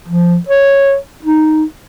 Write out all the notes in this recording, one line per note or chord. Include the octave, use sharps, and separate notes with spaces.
F3
C#5
D#4